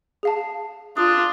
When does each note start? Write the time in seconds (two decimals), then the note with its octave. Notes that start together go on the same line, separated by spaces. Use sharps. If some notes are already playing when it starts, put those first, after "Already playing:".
0.23 G#4 F5 A5
0.97 D4 F4 D#6